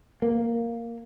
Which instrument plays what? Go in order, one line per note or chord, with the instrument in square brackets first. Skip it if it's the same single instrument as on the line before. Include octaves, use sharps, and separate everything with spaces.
[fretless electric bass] A#3